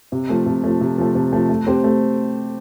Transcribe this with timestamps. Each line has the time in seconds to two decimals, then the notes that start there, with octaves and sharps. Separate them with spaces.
0.12 C3
0.29 F3 A3
0.46 C3
0.64 F3 A3
0.81 C3
0.98 F3 A3
1.15 C3
1.33 F3 A3
1.49 A3
1.67 C4 G4 C5
1.84 A3